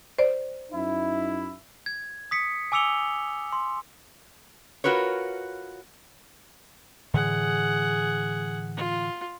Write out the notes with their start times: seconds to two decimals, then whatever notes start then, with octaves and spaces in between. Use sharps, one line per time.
0.18 C5 D5
0.72 F#2 D#4 E4
1.86 G#6
2.31 D#6 B6 C#7
2.72 G#5 D6 E6 C#7 F7 G7
3.53 C6
4.84 F4 F#4 A#4 B4 C#5
7.14 A2 D3 E3 G#4 F#5
8.77 F4